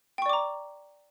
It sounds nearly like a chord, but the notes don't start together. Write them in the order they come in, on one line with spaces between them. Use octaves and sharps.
G5 C#6 D5 D6 A#5